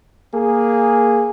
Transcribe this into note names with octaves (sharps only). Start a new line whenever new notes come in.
A#3 G#4